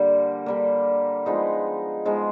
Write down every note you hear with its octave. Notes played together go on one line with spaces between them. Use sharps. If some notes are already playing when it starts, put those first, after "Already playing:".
Already playing: D3 G3 A#3
D3 G3 A#3
F3 G#3 B3 D#4
F3 G#3 B3 D#4